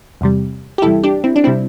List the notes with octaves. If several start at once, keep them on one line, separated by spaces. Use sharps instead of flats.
E2 C3 G3
G4
E2 C3 G3 E4 A4
D4 G4
C4 E4
D4
C3 G3 C4 E4